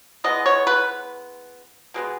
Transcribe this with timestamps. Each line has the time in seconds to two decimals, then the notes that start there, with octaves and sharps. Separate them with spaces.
0.24 E3 G#3 B3 D#5
0.46 C#5
0.67 B4
1.94 B2 G#3 B3